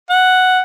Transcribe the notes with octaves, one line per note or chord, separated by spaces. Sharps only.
F#5